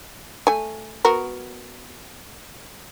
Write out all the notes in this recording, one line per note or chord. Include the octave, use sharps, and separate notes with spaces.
A3 G#5
B3 F#4 A#4